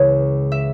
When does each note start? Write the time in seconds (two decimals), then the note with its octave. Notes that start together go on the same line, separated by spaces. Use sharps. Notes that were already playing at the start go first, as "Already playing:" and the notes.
Already playing: C#2 C#3 E3 C#5
0.52 E5